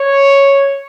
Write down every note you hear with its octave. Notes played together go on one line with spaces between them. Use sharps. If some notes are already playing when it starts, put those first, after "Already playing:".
Already playing: C#5